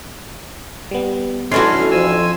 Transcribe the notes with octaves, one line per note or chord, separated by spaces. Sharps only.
G3 B3
E3 C#4 D4 F#4 A4 C6 F6
F2 F3 G#5 E6